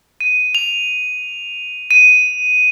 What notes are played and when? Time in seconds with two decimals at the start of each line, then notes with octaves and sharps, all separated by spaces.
0.21 D#7
0.55 F7
1.91 D#7